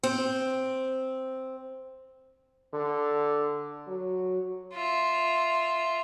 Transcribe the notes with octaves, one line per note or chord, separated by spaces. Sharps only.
C4
D3
F#3
F4 E5